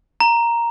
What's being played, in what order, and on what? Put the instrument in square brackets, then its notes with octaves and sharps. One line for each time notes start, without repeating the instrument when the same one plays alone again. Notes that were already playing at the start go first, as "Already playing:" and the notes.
[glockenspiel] A#5